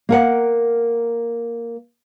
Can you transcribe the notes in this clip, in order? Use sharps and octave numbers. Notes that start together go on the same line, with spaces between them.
A#3 A#4 F#5